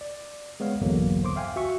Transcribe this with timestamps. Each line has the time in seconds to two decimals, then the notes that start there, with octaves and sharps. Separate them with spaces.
0.01 D5
0.60 G#3 B3 C#5 F5
0.81 A#1 E2 G2 D3 F#3 A#3
1.24 C5 C6 D6
1.36 E5 F5 G5 G#5
1.56 F#4 E5 C#6